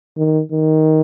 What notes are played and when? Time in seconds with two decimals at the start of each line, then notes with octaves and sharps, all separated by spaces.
0.17 D#3
0.52 D#3